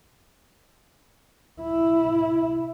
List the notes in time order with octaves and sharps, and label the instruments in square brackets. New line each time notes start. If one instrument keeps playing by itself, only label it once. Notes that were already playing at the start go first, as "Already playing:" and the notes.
[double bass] E4